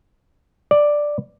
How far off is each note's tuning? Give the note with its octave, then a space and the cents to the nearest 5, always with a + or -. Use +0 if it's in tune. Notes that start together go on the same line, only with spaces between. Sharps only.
D5 +5